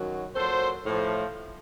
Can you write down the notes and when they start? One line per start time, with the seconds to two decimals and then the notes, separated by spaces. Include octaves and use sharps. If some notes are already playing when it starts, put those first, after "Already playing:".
Already playing: F#2 D#3 F#3
0.36 A#2 F#3 A4 C5
0.85 A2 F3